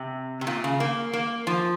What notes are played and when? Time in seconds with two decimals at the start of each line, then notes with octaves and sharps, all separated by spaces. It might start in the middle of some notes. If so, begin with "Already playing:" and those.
Already playing: C3
0.41 C3
0.47 A#2
0.64 C#3
0.80 A#3
1.13 A#3
1.47 F3